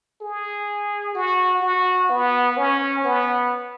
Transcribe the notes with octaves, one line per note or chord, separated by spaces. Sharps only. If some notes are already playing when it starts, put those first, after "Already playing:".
G#4
F#4
F#4
B3
C#4
B3